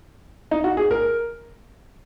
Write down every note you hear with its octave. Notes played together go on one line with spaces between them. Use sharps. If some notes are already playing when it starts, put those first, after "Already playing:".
D#4
F#4
G#4
A#4